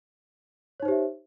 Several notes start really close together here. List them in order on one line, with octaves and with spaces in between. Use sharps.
C#5 D#4 C5 G4 E5